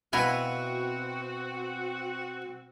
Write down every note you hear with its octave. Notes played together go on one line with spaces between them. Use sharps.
B2 C4 E4 F#4 B4 F5 G#5